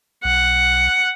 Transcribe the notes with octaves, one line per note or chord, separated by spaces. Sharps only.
B1 F#5